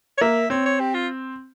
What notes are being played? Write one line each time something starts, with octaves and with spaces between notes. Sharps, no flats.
C#5
A#3 E5
C4 C#5
C#5
G4
F4